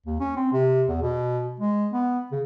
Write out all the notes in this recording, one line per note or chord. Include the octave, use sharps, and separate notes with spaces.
D#2
C#4
C4
C3
E2
B2
G#3
B3
C#3